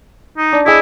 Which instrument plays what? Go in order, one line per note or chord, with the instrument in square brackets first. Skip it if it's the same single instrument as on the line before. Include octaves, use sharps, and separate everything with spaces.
[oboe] D#4
[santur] D4
[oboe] E4 [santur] G#4 D#5